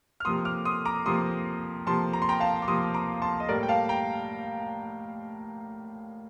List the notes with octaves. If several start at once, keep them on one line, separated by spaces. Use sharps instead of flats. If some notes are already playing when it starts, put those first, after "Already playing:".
F6
C3 F3 A#3 C6 D#6
D6 F6
C6 D#6
A#5 D6
C3 F3 A#3 C6 D#6
C3 F3 A#3 A5 C6
A#5
C6
G5 A#5
F5 A5
D6
C3 F3 A#3 C6 D#6
A#5 D6
A5 C6
D#5
A2 G3 A#3 A#4 D5
G5
F5 A5
G5 A#5